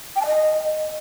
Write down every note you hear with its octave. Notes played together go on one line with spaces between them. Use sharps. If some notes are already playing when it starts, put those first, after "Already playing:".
G5
A5
D#5